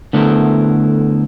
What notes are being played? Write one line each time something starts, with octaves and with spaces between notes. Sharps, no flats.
D3 A3 B3 E4 A#4 C5